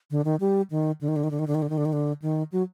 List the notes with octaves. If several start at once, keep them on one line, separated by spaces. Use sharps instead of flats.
D3
D#3
G3
D#3
D3
D#3
D3
D#3
D3
D#3
D3
D#3
D3
D#3
D3
D#3
D3
D#3
F#3